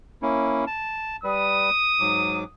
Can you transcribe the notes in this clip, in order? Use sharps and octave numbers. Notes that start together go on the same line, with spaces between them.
A#3 C#4 E4
A5
G3 B4 D#6
G#2 F#3 D6